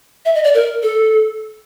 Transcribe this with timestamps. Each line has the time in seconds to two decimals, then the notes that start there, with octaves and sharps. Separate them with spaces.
0.25 E5
0.35 D#5
0.44 D5
0.54 A#4
0.83 A4